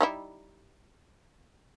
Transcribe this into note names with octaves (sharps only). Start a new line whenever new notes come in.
G3 D#4 E4